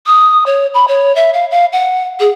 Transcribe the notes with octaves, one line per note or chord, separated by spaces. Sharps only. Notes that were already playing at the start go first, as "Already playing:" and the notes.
D#6
C#5
B5
C#5
E5
F5
F5
F#5
G#4